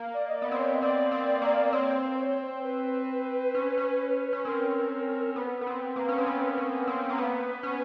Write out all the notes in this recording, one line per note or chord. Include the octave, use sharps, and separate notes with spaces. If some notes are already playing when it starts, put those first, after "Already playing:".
Already playing: A#3
D5
D#5
D5
B3
C4 C5
C#5
D#5
C4 D5
C4
A#3
C4 C#5
C5
C#5
C5
B4
C#4
C#4
C#4
C4 A#4
B3 B4
B3
C4
A#3
C#4
C4
B3
C#4
C4
A#3
B3 B4
C#4